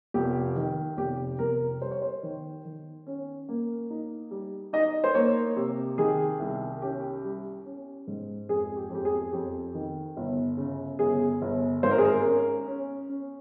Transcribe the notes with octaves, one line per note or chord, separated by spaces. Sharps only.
F1 G4
D#3
F1 G4
F1 A#4
G3 C5
C#5
C5
D#3
D#3
C#4
A#3
D#4
G3
D#4 D#5
C5
A#3 C#5
C3
D#3 G#4
C2
C#4 G4
G3
C#4
G#2
F2 G#4
G4
F2 G4
G#4
F2 G4
D#3
G1
C#3
G1 G#4
G1
G#1 C5
A#4
G#4
A#4
C#4
C#4
C#4